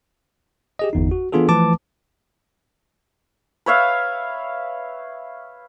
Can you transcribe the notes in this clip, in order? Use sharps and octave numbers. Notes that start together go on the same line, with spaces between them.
G4 G#4 D#5
G1 E2 D#4
F#4
E3 B3 D4 F4 G#4 A4
E3 F3 A3 B4 A5 D6
B4 C#5 E5 F5